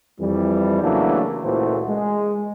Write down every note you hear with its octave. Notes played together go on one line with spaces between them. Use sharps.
F2 E3 G3
C#3 E3 F#3 A3 A#3 D4
C#2 A#2 E3 A3 F#4 C5
G#3